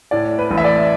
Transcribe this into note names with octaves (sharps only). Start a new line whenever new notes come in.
A2 D5
B4
A1
E5
D5